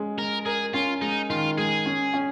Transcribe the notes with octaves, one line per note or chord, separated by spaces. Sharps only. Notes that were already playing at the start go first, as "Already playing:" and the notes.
Already playing: G#3 C#4
G#3 A#4
G#4 A#4
C#4 F4
G#3 D#4
D#3 F4
G#3 G#4
C#4
C#4